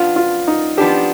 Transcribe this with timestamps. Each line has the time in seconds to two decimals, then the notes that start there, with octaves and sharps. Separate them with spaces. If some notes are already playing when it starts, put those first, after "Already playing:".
Already playing: F3 B3 D4 F4
0.16 F4
0.47 D#4
0.77 F3 B3 D4 G4